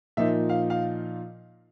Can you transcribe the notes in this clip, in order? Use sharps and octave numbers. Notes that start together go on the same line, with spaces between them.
A#2 F3 A#3 D#4 E5
F5
F5